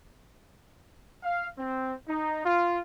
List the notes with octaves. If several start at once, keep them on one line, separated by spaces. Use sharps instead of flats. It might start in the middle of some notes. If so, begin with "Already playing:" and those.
F5
C4
D#4
F4